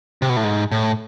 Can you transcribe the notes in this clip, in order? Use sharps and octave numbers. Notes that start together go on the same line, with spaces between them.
C3
B2
A2
G#2
A2